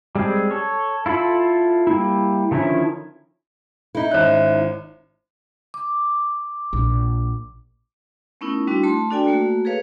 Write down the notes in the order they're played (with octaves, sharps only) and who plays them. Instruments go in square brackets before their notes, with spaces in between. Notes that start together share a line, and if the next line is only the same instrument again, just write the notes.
[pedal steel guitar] G3 G#3 C4 G#4
A4 C#5
E4 F4 A4 B5
G3 A#3 E4
D3 D#3 F3 C#4 E4
[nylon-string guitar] D#4 E4
[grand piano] G#1 C#4 F#6
[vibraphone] D6
[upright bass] A#1
[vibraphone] A3 B3 C#4 D#4 E4 A#4
G3 C4 D4 E4 F#4
A3 A5 C6
D4 F#4 A4 D5 G5 G#5
A3 A#3 F#4
G#4 A4 B4 C#5 F5